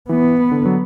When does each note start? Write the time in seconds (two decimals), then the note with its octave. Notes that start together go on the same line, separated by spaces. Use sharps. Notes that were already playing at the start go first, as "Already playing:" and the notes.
0.09 E3 B3
0.51 D3
0.66 F#3